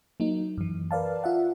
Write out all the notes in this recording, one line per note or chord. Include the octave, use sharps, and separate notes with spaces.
F#3 A#3 D#4
F#2 E3
A#4 B4 D5 F5 A5
F4 E5 F#5